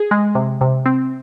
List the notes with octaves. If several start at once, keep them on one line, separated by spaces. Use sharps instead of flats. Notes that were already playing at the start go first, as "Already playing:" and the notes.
Already playing: G#4
G#3
C3
C3
C4